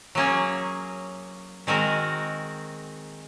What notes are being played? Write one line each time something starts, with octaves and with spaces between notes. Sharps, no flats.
F#3 A#3 C#4 G#4
D#3 G#3 C4 F#4 A#4